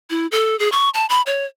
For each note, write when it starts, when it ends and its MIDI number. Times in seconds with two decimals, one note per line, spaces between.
0.10 0.27 64
0.32 0.58 69
0.59 0.71 68
0.72 0.89 85
0.94 1.06 81
1.09 1.22 83
1.26 1.45 73